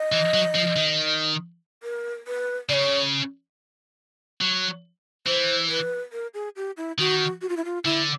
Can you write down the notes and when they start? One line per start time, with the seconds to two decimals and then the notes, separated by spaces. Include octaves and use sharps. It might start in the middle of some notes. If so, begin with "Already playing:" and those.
Already playing: D#5
0.12 E3
0.34 F#3
0.55 F3
0.76 D#3
1.83 A#4
2.27 B4
2.69 C#3 C#5 D5
4.41 F#3
5.26 E3 C5
5.69 B4
6.12 A#4
6.34 G#4
6.56 G4
6.77 E4
6.98 D#3 F#4
7.41 F#4
7.49 F4
7.57 E4
7.65 F4
7.84 D3 E4